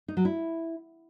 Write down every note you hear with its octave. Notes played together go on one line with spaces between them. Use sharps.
D#4
F#3
E4